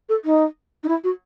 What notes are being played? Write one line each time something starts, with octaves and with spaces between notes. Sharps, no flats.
A4
D#4
D#4
E4
F#4